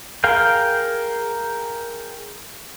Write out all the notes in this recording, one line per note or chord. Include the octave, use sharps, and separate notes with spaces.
G#4 A#4 F5 G5